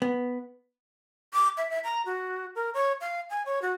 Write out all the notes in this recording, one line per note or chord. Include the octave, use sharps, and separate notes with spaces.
B3
D6
E5
E5
A#5
F#4
A#4
C#5
F5
G#5
C#5
F#4